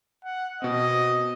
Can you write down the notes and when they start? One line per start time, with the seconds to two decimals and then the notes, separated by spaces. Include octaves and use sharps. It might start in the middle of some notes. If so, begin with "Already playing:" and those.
0.24 F#5
0.62 B2 C4 D#5